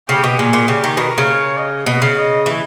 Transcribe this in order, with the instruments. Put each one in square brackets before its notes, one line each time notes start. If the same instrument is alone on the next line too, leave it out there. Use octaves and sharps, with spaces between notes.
[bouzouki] C#3 [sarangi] G4
[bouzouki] B2
[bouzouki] A#2 [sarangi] G#4
[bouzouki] A#2
[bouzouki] C#3 [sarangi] G4
[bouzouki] D#3
[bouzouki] B2 [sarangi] A#4
[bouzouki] C#3
[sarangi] C#5
D#5
[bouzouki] B2 [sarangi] D#5
[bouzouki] C#3
[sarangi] D#5
[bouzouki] E3